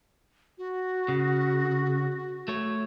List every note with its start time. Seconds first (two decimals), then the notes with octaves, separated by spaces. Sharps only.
0.58 F#4
1.08 C#3
2.48 A3 C#5